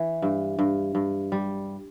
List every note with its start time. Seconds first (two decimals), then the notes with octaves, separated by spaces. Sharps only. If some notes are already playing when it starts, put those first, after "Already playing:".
Already playing: E3
0.22 G2
0.59 G2
0.95 G2
1.32 G3